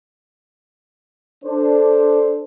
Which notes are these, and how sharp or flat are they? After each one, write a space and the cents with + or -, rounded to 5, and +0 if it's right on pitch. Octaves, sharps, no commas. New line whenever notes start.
D4 +0 A4 +0 C5 +0